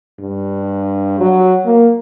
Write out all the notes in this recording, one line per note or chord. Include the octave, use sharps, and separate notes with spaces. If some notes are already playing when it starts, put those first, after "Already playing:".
G2
F#3
A#3